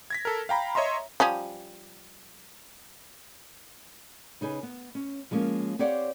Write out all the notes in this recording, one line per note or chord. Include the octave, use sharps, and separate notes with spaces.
G#6 A#6 B6
A4 A#4
F5 G5 A#5 B5
C#5 D#5 E5 A#5 C6
F3 G3 C#4
C#3 D#4 G#4 B4
B3
C#4
F3 G#3 A#3 C#4
C4 G4 C#5 D5 F5 F#5